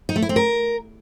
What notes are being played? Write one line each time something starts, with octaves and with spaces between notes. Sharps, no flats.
D#4
A3
E4
C4
A#4